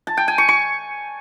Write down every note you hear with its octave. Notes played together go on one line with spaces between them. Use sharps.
A5
G5
G#5
C#6
C#6